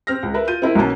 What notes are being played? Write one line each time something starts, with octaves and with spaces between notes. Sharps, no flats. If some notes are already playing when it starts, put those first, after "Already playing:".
C4 F6 A#6
C#2
A#4 B4 E5
F4 G6 D#7
C4 E4 A#4
B1 B2 A#3 C#4 A5 A#5